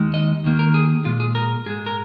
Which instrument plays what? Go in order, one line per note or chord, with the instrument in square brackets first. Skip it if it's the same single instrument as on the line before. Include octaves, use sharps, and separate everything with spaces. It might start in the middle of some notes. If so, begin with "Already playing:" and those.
Already playing: [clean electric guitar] D#2 D#3 G#3
D#5
D#2 D#3 A#3
A#4
G#4
A#2 G#3 F4
G#4
A#4
G#2 G#3 G#4
A#4